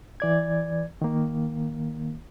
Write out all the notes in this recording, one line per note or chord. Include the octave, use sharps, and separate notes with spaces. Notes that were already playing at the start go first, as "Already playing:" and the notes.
E3 D5 G#6
D#3 A#3